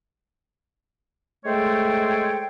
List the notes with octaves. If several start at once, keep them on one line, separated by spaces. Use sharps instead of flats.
G#3 A3 A4 C5 C#5 G5